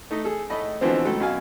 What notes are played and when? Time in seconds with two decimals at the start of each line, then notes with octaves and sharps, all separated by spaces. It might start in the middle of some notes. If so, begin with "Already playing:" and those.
0.11 A3 D#4
0.24 G#4 A4
0.50 A2 A3 D#5 B5
0.81 B2 D3 E3 F3 C4
1.05 C#2 F#3 A3 A4
1.20 F#2 B2 F5 G#5